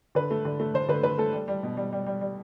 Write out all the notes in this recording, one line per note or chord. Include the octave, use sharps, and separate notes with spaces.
D3 B4
A3
D3
A3
D3 C5
D3 B4
D3 B4
A3 A4
G3
G3
B2
G3
G3
G3
G3